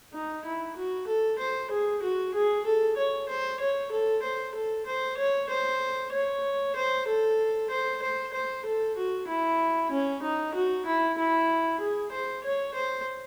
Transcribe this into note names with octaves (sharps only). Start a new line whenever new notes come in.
D#4
E4
F#4
A4
C5
G#4
F#4
G#4
A4
C#5
C5
C#5
A4
C5
A4
C5
C#5
C5
C#5
C5
A4
C5
C5
C5
A4
F#4
E4
C#4
D#4
F#4
E4
E4
G#4
C5
C#5
C5